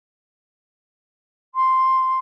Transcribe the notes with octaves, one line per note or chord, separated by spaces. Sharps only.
C6